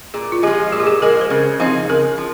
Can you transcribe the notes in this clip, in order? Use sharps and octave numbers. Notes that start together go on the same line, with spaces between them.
A#2 G#4
F4
F3 G#3 G4
A#2 G#4
G4
G#4
F3 G#3 A#4
C5
C#3 A#4
F3 C4 D#4 G#4 C5
C#3 A#4
F3